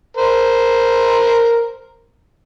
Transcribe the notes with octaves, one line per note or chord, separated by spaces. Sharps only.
A#4 C5